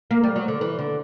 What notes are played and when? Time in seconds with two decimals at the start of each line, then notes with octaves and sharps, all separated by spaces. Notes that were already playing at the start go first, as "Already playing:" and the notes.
0.11 A#3
0.23 G3
0.36 F#3
0.48 D3
0.61 E3
0.79 D3